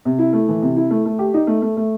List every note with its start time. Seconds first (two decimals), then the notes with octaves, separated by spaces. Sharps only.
0.05 C3
0.19 E4
0.33 A3
0.48 E3
0.62 C3
0.77 E4
0.91 A3
1.06 A3
1.19 G4
1.34 D#4
1.47 A3
1.62 A3
1.77 A3